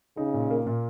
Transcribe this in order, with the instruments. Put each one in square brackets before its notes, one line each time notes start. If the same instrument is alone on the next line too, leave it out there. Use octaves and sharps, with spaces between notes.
[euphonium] C#3 [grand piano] D#4
[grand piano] A#2
A#3
A#2